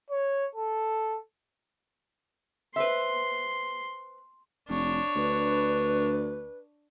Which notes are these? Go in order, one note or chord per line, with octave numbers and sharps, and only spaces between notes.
C#5
A4
B4 C5 E5 C6
F1 D4 C#5
D2 B4